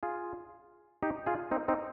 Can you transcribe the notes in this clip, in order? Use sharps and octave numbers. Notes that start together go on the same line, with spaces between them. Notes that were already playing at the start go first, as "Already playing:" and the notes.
F4 G#4
D#4 G4
F4 G#4
C4 D#4
C4 D#4